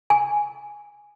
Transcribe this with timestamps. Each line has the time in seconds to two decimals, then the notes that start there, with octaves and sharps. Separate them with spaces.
0.10 G#5